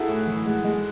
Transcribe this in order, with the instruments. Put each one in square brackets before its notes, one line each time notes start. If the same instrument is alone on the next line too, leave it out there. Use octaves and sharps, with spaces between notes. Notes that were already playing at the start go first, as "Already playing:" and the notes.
Already playing: [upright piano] D#4 E4 F#4 G#4 A4
[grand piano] A2
E3
G#3
G#3